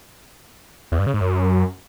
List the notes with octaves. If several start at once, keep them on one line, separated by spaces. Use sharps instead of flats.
E2
G2
C#3
G#2
F#2